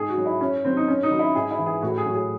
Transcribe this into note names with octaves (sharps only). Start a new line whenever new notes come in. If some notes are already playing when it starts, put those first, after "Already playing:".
Already playing: G#2 G#4
F#4
F#3
E4
F#2 C#4
D#3 F#3 C4
D#4
F#2 C#4
D#4
D#3 F#3
E4
G#2 G#4
E4
E3
G#4
A2 F#4
G#4
F#3 F#4
G#4